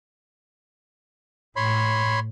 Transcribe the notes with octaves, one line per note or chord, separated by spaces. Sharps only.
A2 C#5 B5 C6